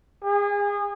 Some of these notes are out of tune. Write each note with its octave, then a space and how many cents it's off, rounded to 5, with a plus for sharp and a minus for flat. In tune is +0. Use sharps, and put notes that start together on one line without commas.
G#4 -30